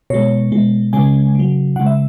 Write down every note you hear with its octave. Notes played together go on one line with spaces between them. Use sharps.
B2 G#3 C#5
B2 G#3
C#3 G#3 G#5
C#3 F#3
C#3 G#3 F#5
E5